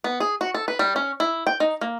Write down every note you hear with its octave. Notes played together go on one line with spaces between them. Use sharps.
B3
G#4
F#4
A4
B4
G3
C#4
E4
G5
D#4
A#3